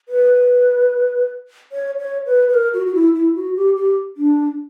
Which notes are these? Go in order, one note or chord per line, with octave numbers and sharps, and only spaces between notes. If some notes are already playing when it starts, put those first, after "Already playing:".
B4
C#5
C#5
B4
B4
A#4
F#4
F#4
E4
E4
F#4
G4
G4
D4